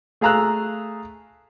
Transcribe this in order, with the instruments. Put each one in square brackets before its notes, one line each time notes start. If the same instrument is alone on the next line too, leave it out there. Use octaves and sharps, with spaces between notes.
[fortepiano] A3 G#4 F5 A#5 E6 F#6